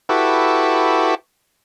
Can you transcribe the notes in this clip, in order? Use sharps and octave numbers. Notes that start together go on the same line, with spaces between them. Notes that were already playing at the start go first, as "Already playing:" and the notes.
E4 F#4 G4 A4 B4